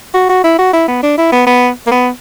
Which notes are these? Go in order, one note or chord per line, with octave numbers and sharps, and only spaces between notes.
F#4
F#4
E4
F#4
E4
B3
D4
E4
B3
B3
A#3
B3